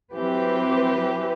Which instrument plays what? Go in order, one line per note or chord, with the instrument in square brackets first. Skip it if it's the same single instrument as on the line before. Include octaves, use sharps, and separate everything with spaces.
[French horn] E3 [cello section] F#3 C4 G4 B4